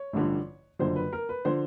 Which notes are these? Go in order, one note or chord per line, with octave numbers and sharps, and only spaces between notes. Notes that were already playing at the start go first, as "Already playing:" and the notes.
Already playing: C#5
A1 G2 D3 F3
F#1 F#2 D3 F3 C5
B4
A#4
B4
D3 F3 C5